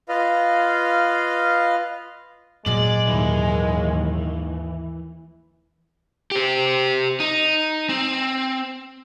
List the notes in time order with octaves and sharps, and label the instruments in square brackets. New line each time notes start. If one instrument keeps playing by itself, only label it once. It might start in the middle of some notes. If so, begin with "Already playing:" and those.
[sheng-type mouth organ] F4 B4 D#5 F5
[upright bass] A#2 F#3 [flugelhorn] G#3 [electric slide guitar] D5
[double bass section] D#2 G#2 D#3 [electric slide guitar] E3
[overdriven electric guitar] G4 C5
D#4
C4